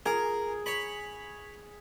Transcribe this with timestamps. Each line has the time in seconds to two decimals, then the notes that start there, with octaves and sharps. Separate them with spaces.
0.06 G#4 A#4
0.66 C#5 B5